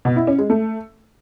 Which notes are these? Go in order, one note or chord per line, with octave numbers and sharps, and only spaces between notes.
B2
E4
C#4
G#3
A3